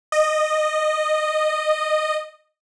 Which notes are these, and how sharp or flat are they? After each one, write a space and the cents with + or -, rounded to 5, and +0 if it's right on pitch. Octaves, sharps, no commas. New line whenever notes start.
D#5 -15